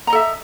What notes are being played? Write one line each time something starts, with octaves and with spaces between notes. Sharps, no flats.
A4 D#5 E5 A#5